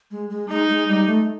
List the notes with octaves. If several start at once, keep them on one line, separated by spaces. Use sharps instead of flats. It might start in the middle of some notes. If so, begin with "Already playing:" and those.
G#3
G#3
G#3 D#4
G#3
G3
A3